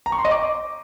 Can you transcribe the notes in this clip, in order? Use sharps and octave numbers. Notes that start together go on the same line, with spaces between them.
A#5
C#6
C6
D#5
D6